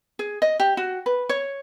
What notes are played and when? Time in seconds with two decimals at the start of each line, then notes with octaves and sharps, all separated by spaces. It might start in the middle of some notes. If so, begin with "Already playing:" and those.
0.19 G#4
0.42 D#5
0.60 G4
0.77 F#4
1.06 B4
1.29 C#5